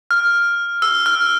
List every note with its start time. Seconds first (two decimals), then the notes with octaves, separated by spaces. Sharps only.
0.11 F6
0.82 E6
1.06 F6